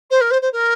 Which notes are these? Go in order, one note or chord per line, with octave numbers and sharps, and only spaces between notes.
C5
A#4
C5
C5
A#4